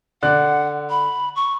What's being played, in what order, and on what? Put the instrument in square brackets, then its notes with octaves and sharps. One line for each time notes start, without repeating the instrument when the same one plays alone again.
[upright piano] D3 D5 F#6 [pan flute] F#5
[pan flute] B5
C#6